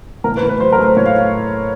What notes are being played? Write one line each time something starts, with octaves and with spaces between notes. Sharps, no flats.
A2 A#4
B4
A2
B4
F#3 C5
A#4
A3
C5
A2 C#5
F5